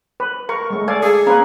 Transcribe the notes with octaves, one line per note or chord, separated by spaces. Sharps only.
B4
A#4 C#6
G#3 A3
A4 D5 F5 G#5
G#4 A4
A#3 C#4 B4